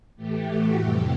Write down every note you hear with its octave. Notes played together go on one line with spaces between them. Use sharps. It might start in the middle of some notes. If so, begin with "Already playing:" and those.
A2 E3 A3 G4
F#4
F2 C3 E3 G3 G4